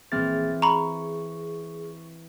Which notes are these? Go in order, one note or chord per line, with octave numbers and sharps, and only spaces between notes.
A#1 E3 C4 G#4 F6 A6
A#5 B5 C#6